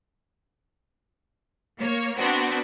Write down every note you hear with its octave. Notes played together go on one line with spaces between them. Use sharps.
A#3 C#5
B3 C4 D4 F#4